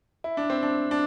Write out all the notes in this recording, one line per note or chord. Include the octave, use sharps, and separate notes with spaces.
E4
D4
C4
D4
D4